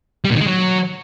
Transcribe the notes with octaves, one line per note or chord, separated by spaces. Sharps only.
G3
A#2
D#3
G#3
F#3